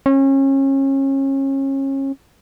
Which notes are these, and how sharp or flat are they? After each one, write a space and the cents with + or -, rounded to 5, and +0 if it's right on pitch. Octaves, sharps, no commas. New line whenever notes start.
C#4 -30